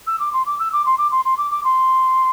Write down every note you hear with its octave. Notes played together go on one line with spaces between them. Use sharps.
E6
D6
C6
D6
E6
D6
C6
D6
C6
C6
D6
D6
C6